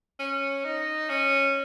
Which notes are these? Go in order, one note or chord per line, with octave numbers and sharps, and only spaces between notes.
C#4
D#4
C#4